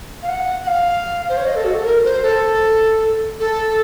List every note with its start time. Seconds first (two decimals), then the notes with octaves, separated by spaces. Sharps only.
0.23 F5
0.29 F#5
0.63 F#5
0.67 F5
1.29 C5
1.37 C#5
1.45 D#5
1.55 A4
1.65 F#4
1.75 A4
1.84 A#4
2.04 C5
2.23 A4
3.40 A4